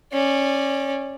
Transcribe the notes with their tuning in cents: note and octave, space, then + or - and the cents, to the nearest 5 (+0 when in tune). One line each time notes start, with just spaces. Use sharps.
C#4 -15 D5 +0